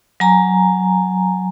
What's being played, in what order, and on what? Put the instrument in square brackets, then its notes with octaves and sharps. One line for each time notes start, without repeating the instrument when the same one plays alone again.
[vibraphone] F#3 G#5 A#5